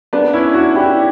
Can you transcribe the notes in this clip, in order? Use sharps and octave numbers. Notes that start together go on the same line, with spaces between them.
B3 D4
C#4 E4
D4 F#4
E4 G4